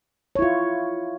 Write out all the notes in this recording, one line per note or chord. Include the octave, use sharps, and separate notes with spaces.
E4 F4 C#5